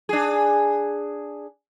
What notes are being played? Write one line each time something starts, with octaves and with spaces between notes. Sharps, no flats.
D4 G#4